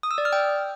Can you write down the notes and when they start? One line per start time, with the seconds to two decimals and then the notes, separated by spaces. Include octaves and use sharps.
0.03 D#6
0.11 E6
0.18 D5
0.25 F6
0.33 G5